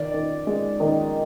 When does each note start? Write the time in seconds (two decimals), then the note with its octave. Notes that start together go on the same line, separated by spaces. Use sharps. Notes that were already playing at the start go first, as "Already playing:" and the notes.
Already playing: D#3 D5
0.14 D#3
0.47 G#3
0.80 D#3